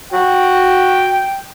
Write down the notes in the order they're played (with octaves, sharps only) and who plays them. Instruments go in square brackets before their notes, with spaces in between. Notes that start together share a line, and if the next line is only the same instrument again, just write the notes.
[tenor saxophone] F#4 [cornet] G5